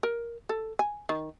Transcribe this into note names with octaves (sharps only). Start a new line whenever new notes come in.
A#4
A4
G#5
D#3